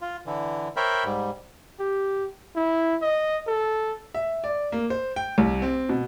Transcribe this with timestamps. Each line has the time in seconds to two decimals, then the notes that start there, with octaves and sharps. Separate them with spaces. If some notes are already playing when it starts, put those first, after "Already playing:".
0.01 F4
0.26 D3 E3
0.76 A#4 C5 C#5 E5 G5 B5
1.04 G#2 G3
1.79 G4
2.56 E4
3.02 D#5
3.47 A4
4.14 E5
4.44 D5
4.72 A#3
4.90 C5
5.16 G5
5.38 C2
5.62 C4
5.89 B2